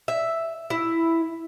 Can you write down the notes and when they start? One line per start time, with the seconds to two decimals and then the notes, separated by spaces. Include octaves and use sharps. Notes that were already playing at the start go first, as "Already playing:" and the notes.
0.08 E5
0.70 E4